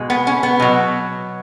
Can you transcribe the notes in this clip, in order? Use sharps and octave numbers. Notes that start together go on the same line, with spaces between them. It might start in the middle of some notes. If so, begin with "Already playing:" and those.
Already playing: B2 G#3
B3
C#4
B3
B2 F#3